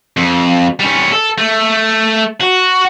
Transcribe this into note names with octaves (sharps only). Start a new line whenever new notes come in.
F2
G3 C#4
A4
A3
F#4